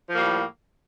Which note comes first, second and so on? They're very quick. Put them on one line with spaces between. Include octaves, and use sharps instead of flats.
F3 A#3 G3 A2